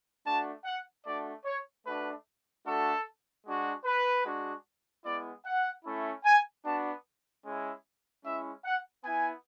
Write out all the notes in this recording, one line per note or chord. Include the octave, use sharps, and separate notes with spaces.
A3 D4 F#4 A5
F#5
A3 D4 F#4 D5
C#5
A3 D4 F#4 B4
A3 D4 F#4 A4
G#3 D4 F#4
B4
G#3 D4 F#4
G#3 B3 E4 D5
F#5
A3 C#4 E4
G#5
B3 D4 F#4 A5
G#3 C#4 E4
G#3 C#4 E4 E5
F#5
B3 E4 G#5